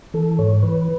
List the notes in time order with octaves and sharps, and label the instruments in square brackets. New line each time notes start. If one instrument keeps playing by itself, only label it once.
[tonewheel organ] E3 A4
G#2 C#5
E3 B4